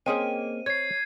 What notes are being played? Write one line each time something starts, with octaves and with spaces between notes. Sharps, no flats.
A#3 C4 C#4 G#4 D#5 D#7
C#5 G#6 C7